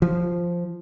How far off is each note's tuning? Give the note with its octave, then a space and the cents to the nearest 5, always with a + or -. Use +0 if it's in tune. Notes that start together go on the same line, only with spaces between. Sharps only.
F3 -5